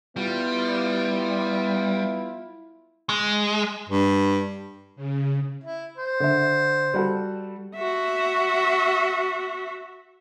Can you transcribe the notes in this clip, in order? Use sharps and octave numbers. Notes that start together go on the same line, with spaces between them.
G3 B3 E4 F4
G#3
G2
C#3
E4
C5
D3 E5
G3 F#4 A4
F#4 E5